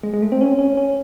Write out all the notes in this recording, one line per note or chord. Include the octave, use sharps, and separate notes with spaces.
G#3
G#3
A3
C4
C#4
C#4
C#4